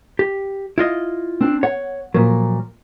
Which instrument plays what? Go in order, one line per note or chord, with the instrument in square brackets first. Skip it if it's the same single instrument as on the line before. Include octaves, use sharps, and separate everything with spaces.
[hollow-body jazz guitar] G4
E4 F4 D#5
[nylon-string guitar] C4 D4
[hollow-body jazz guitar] C#5 [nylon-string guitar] F#5
[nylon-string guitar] A#2 A#4 [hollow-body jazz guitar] F3 F#3